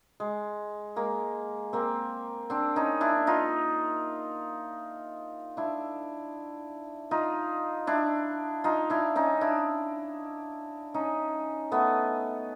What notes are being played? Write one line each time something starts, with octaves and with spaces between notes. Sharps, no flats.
G#3
G#3 A#3
A#3 C4
C4 D4
C#4 D#4
D4 E4
D#4 F4
D4 E4
D#4 F4
D4 E4
D#4 F4
D4 E4
C#4 D#4
D4 E4
C#4 D#4
A3 B3